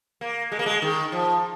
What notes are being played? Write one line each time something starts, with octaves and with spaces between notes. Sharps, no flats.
A#3
G#3
A#3
G#3
D#3
F3